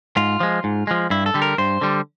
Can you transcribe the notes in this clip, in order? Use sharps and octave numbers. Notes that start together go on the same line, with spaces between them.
G#2 F4
F3 G#3
G#2
F3 G#3
G2 E4
A4
D3 G3
A#4
G2 C5
D3 G3